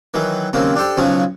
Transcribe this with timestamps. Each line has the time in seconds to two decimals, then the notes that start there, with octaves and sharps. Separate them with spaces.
0.14 D#3 E3 F#3
0.53 D#2 C#3 F#3 A#3 C4
0.76 D4 G4 A4 C5 G5
0.97 B1 C#3 F3 F#3 C#4